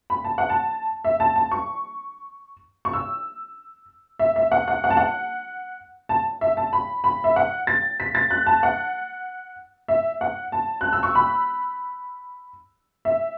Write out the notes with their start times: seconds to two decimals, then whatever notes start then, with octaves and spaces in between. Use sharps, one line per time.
0.10 B5
0.24 A5
0.38 F#5
0.49 A5
1.04 E5
1.20 A5
1.36 A5
1.51 C#6
2.85 C#6
2.93 E6
4.19 E5
4.36 E5
4.52 F#5
4.68 F#5
4.84 F#5
4.90 A5
4.97 F#5
6.09 A5
6.41 E5
6.57 A5
6.73 B5
7.04 B5
7.24 E5
7.36 F#5
7.67 A6
8.00 B6
8.15 A6
8.30 F#6
8.46 A5
8.63 F#5
9.88 E5
10.21 F#5
10.52 A5
10.81 F#6
10.93 E6
11.03 C#6
11.15 B5
13.05 E5